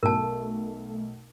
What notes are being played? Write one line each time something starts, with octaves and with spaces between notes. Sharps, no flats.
B1 A3 A#4 A5